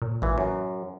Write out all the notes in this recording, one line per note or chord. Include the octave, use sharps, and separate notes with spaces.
A#2
A1 A#2 E3
F#2